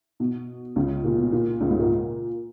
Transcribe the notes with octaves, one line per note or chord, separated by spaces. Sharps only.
B2
C#2 C#3
A#2
B2
A#2
C#2 C#3
G#2 G#3
A#2 A#3